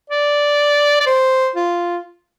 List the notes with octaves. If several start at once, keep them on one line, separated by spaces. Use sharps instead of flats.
D5
D5
C5
F4